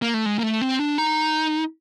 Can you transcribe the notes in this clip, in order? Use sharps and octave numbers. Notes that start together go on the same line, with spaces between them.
A#3
A3
G#3
A#3
A3
C4
D4
D#4